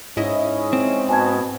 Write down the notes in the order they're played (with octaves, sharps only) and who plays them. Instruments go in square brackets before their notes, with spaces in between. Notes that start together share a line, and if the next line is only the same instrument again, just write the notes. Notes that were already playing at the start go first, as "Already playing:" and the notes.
[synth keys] G#2 E4 D#5 [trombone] C#4
[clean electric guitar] C4
[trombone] B2 [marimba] G#5 A5 G#6